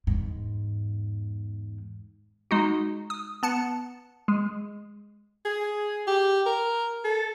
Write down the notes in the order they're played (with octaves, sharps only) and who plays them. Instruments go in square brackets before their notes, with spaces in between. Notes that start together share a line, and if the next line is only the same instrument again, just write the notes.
[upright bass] E2 G#2
[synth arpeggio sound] G#3 D#4 F#4
D#6
B3 A5 C#7
G#3
[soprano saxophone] G#4
G4
A#4
A4